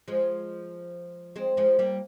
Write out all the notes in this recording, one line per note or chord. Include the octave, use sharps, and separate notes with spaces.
F3 G#3
G#3 C4
F3 G#3
G3 A#3